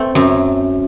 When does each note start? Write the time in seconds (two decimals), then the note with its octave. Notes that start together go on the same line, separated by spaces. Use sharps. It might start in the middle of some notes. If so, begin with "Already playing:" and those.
Already playing: A3 C4
0.15 F#2